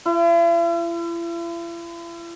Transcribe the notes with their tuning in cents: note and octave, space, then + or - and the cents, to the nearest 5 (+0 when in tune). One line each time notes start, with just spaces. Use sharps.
E4 +45